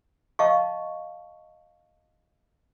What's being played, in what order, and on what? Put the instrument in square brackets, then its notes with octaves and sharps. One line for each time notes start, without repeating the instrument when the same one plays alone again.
[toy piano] D#5 F5 A5 C#6